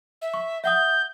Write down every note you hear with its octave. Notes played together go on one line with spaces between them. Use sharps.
E5
C#6
E5 F#5 D#6 G6